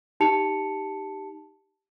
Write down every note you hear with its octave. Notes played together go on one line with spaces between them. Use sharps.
D#4 G4 A5 C#7 F7